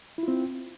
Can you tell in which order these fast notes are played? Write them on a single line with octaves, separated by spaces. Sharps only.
E4 F4 C4